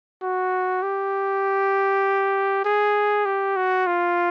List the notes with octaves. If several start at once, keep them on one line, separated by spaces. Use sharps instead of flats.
F#4
G4
G#4
G4
F#4
F4